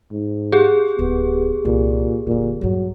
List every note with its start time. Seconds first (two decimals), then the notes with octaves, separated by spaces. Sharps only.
0.12 G#2
0.52 G4 G#4
0.99 D1 B3
1.65 C2 A#2
2.27 F1 A#2 D3
2.61 A#1 G2 F#3